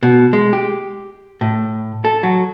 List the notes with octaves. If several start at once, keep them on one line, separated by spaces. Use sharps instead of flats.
B2
G#3
G4
A2
A4
F#3